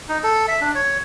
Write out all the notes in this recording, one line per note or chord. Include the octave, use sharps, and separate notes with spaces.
D#4
A4
E5
D4
C#5